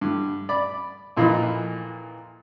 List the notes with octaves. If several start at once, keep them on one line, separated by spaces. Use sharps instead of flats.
G2 D3
D5 B5
F2 A#2 E3 A#3 D#4 B5